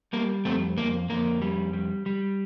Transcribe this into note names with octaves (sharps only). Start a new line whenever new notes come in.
G3 A#3
F2 A3 C4
F2 A#3
F2 A#3
G3
G3
G3